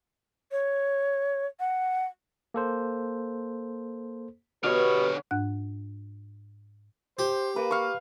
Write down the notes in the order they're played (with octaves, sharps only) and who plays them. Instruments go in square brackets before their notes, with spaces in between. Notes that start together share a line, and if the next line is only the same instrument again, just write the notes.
[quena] C#5
F#5
[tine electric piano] A#3 A4 C5
[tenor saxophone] B2 [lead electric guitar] D3 C#5 [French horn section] B3 G4 B4 [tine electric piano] F6
[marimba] G#2 D4 F#5 F#6
[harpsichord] G4 [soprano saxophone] C5
[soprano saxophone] A#3 [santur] B4
[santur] F5 C#6